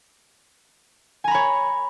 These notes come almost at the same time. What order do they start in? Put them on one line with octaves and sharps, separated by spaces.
G#5 A#5 B5 C#5